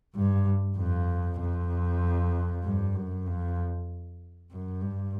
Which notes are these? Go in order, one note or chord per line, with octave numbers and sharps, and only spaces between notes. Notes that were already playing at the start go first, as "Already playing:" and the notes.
G2
F2
F2
G2
F#2
F2
F#2
G2